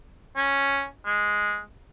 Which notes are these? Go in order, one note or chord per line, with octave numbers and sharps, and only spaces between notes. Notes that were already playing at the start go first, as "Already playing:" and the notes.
C#4
G#3